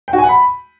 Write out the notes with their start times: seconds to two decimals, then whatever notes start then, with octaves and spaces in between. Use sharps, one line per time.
0.08 G5
0.13 F#4
0.18 G#5
0.24 F#5
0.29 B5